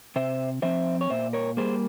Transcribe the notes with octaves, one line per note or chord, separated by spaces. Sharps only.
C3 C5 E5
F3 C4 C5 E5
C#5
A#2 C5 E5
A#4 C#5
G3 A#3 G#4 C5